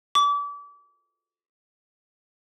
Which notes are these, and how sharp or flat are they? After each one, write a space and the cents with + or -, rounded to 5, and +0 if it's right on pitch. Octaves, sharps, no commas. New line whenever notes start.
D6 -35